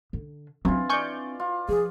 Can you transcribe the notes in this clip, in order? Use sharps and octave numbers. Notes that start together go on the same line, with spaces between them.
D3
E3 F#3 C4 D4 F4
D5 F5 G#5 C#6 G6
F4
F3 G#4